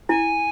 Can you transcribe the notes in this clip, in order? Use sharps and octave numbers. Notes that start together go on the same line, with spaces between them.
E4 G#5